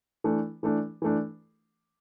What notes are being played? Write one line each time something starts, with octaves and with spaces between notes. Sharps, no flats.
E3 A3 D4
E3 A3 D4
E3 A3 D4